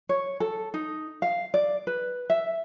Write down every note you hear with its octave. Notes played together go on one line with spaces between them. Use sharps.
C#5
A4
D#4
F5
D5
B4
E5